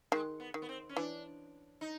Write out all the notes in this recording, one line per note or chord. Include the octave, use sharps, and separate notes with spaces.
D#3 G#3
B3
D#3
B3
C4
C#4
E3 D4
D#4